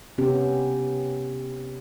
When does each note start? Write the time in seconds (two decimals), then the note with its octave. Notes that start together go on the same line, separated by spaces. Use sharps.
0.18 C3 B3 C#4 G4